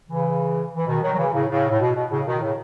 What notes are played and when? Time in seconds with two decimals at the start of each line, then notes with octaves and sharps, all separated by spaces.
0.09 C#3 E3
0.76 E3
0.87 B2 D#3
1.01 D#3 F#3
1.13 F#3
1.17 C#3 E3
1.33 A2 C#3
1.49 A2 C#3
1.69 A2
1.80 B2
1.95 B2
2.10 A2 C#3
2.26 B2 D#3
2.42 A2 C#3